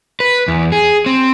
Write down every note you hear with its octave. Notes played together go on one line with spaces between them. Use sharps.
B4
E2
G#4
C4